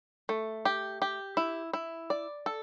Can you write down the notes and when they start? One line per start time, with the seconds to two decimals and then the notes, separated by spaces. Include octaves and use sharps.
0.29 A3
0.65 G4
1.02 G4
1.37 E4
1.73 E4
2.10 D5
2.46 A4